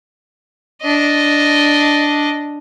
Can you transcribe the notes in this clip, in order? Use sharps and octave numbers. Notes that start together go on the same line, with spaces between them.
D4 D#5